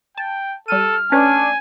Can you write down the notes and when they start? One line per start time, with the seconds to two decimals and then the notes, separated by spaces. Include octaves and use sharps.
0.18 G5 A5
0.68 G3 A4 F6 D#7
1.12 A3 C#4 D4 B4 C#5 G#5